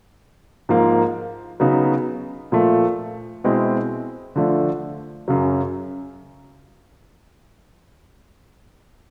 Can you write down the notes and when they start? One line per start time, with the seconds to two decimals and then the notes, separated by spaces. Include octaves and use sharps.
0.69 G#2 F3 A#3
1.60 C#3 F#3 B3 D#4
2.52 A#2 F3 A3
3.44 B2 G#3 C4 E4
4.36 D3 F3 A3 D4
5.28 F#2 C#3 F#3